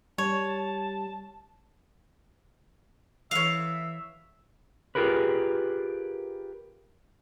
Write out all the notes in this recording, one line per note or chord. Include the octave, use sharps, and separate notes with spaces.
G3 C#5 A5
E3 C#5 E5 F5
F4 G4 G#4 A#4 B4